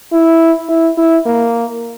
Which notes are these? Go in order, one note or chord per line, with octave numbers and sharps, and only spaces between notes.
E4
E4
E4
A#3